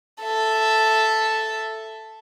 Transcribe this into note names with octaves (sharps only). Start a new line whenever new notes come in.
A4 E5